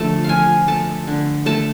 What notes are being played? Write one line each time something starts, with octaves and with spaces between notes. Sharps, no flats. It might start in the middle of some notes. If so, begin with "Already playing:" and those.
Already playing: D3 F3 A3 A5
F3 F5 G#5
A3 A5
D3
A3 A5